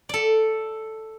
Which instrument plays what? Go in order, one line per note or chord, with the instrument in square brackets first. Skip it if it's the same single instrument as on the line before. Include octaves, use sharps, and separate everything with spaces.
[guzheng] A4 D5